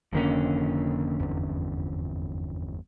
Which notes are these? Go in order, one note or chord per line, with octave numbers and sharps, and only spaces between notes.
F1 F2 D3 D#3 A#3 C#4
G1 E2